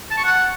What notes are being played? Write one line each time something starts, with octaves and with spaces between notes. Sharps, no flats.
A5
C#6
F#5